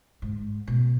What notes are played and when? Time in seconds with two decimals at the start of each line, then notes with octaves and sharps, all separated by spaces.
0.22 G#2
0.67 B2